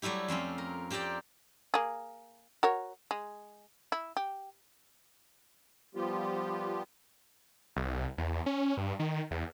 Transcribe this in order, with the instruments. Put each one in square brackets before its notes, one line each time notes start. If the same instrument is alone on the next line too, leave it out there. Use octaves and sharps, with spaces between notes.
[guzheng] F#3 G3 A3 E4 G4
F2 C4 C#4 F4
A#4
C4 G4 A#4 D5 G5
[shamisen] A#3 G#4
F#4 A#4 C#5
G#3
E4
G4
[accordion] F3 G3 B3 F4 G4
[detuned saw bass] C2
E2
C#4
G2
D#3
E2